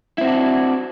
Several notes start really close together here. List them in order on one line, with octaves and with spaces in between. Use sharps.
E4 C4 F#4 D4